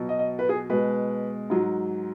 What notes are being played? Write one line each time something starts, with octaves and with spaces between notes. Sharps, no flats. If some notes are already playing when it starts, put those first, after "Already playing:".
Already playing: B2 F#3
D#5
D#5
B4
G#4
B2 G#3 B4
G#2 F#3